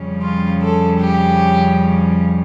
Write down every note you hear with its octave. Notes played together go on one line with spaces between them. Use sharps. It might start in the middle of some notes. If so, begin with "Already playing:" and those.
Already playing: F2 C#3 G3 C#4
F4
A4
G4